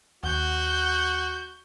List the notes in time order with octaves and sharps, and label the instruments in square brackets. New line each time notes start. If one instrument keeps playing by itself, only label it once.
[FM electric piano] D#2 F#5 [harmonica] F#4 [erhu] G6